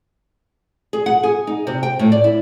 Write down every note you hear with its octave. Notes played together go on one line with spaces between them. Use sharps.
G#4
F#5
G#4
D#4
C3
G5
A2
D5
E4